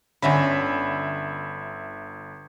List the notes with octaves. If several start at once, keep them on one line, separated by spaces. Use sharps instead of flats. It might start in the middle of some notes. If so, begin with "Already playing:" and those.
G1 D3 C#4 E5 A#5 B5